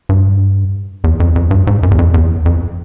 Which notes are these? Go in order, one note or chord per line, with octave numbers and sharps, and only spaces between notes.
G2
E2
F2
F2
G2
G#2
F#2
E2
F2
E2
F2